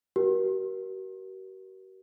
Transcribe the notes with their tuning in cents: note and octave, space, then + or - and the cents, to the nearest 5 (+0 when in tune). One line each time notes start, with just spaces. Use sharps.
F#4 +45 A#4 +30